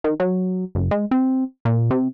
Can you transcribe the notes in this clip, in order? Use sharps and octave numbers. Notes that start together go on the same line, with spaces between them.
D#3
F#3
F#1
G#3
C4
A#2
C3